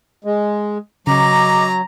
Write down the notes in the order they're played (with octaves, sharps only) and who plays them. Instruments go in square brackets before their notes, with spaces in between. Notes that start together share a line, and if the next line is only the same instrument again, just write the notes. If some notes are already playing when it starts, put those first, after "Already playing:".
[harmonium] G#3
[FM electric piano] C#3 [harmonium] F#3 [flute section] D#5 D6 [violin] A#5